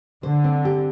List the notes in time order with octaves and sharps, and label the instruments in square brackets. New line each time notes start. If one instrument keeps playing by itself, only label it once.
[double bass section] D3 [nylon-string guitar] C5
[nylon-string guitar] C4
G4